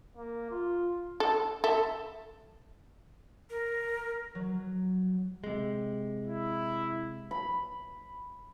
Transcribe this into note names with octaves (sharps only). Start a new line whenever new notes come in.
A#3
F4
A4
A4 E5
A#4
F#3
C3 G#3
E4
B5